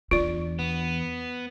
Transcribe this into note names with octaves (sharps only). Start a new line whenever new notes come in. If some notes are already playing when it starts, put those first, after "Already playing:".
E2 D4 F4 D5
B3